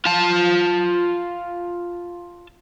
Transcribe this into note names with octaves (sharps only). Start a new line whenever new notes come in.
F4 A5